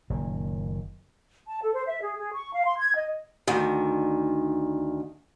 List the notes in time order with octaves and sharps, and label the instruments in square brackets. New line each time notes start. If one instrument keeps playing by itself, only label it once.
[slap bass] F#1 A#2 D#3
[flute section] A5
A4
C5
E5
G#4
G#4
C#6
F5
C6
G#6
D#5
[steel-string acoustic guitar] D2 D#3